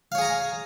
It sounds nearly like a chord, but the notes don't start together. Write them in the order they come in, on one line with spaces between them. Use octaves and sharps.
F5 C#5 G#4 A#5 G#5